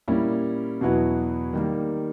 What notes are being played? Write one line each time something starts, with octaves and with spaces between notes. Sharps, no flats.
A#2 G3 A#3 C#4 E4
E2 B2 F#3 B3 E4
D#3 G3 A#3